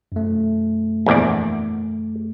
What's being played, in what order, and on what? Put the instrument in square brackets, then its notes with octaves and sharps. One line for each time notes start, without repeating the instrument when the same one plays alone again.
[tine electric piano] F#2 A3
[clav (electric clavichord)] A#1 E2 D5